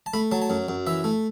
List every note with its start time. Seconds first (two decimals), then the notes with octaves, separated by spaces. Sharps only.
0.06 A5
0.14 A3 B5
0.31 F#3 A5
0.42 A5
0.50 F#2
0.68 F#2
0.87 E3 E5
1.04 A3